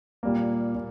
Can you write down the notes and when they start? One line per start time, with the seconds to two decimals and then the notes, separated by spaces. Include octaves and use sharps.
0.23 A#2 G3 A#3
0.75 A#2